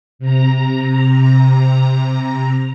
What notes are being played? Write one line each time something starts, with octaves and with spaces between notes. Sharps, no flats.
C3 A#5